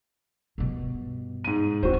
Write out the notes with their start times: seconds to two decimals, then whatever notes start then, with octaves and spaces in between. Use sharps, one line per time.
0.58 G2 B2
1.44 G#2 D#7
1.83 D#1 F2 C4 F#4 C5